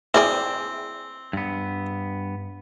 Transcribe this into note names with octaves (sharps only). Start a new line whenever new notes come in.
C4 E4 G#4 D5
G2 B3